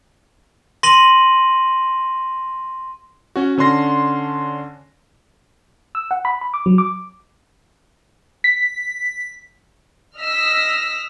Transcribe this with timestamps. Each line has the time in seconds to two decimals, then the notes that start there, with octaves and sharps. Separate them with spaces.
0.83 C6 A#6 D#7 F#7
3.36 C#4 F#4
3.58 D3 C#4 D4 C6 A#6
5.95 E6
6.11 F#5
6.25 B5
6.41 B5
6.54 D6
6.66 F#3
6.78 D6
8.44 B6
10.18 D#5 E6 F6 A#6 B6